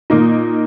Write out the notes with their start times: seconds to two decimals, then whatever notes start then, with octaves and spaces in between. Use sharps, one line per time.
0.10 A#2 A#3 D#4